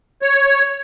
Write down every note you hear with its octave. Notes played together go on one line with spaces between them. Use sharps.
C#5